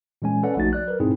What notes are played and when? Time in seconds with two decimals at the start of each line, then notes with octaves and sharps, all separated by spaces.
0.22 A#2 E3 G#3 C#4 G#5
0.43 C#4 A4 B4 D5 F#5
0.56 A#1 F3 A3 D#4 F#4 A6
0.73 F#3 D5 F#6
0.88 A#4 B4
1.00 G#2 B2 C4 D#4 E4 G#4